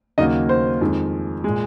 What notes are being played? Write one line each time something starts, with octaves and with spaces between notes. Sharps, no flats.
D#2 C#3 F#3 A#3 D#4 D#5
C5
F2 D#3 G#3
A#2 G#3